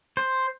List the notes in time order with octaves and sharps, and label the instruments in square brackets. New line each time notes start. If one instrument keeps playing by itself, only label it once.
[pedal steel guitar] C5